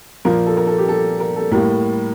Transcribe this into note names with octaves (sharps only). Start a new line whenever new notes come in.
A#2 F3 A#3 A#4
A4
A#4
A4
G4
A4
A#4
A4
A2 G3 A#3 A#4